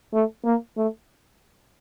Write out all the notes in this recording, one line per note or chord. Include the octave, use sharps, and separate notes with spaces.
A3
A#3
A3